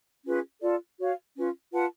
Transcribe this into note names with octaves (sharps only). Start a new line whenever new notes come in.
C#4 F4 G#4 B4
F4 A4 D5
F#4 C#5 F5
C#4 F4 B4
F4 B4 F#5 A5